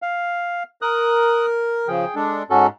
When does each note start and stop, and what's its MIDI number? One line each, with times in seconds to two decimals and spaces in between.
0.02 0.63 77
0.82 1.88 70
0.82 1.46 87
0.82 1.46 90
1.88 2.05 49
1.88 2.05 53
1.88 2.15 68
1.88 2.15 79
2.16 2.43 56
2.16 2.43 62
2.16 2.44 69
2.50 2.68 44
2.50 2.67 61
2.50 2.67 66
2.50 2.67 69